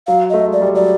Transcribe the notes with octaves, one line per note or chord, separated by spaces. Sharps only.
F#3 F5
A3 D#5
G#3
D5
G3
F#3 D5